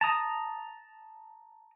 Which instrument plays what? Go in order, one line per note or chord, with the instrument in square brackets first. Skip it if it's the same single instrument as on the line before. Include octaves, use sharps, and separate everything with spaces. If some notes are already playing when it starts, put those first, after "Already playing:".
[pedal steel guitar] A5 A#5 D#6